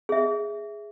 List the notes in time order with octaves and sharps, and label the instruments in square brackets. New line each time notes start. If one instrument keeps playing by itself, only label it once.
[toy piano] G#4 E5